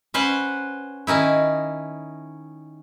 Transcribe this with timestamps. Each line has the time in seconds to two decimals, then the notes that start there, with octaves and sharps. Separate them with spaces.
0.14 C#4 B4 C5 F#5
1.07 D#3 C#4 D#4 E4